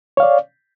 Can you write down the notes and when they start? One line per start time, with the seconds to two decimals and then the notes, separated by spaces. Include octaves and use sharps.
0.17 C#5
0.20 F5
0.23 D5